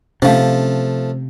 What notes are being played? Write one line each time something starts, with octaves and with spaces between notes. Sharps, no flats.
C3 F3 A3 C#4 D#4 F5